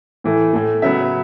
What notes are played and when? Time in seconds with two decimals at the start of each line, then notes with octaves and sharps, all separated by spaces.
0.24 A2 E3 A3
0.53 A2 A3
0.82 C#3 F#3 B3 E5